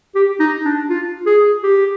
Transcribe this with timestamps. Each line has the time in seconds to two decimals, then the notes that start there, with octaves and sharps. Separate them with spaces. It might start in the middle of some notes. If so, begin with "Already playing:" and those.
0.15 G4
0.40 D#4
0.65 D4
0.90 F4
1.26 G#4
1.63 G4